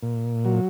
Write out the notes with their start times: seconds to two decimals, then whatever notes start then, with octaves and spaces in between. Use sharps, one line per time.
0.03 A#2
0.45 F#3